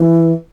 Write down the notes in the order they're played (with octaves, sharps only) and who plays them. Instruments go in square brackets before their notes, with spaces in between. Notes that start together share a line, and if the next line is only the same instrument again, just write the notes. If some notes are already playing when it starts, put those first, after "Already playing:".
Already playing: [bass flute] E3